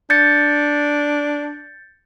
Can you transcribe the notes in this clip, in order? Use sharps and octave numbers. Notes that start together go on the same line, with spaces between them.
D4 G6 A6 C#7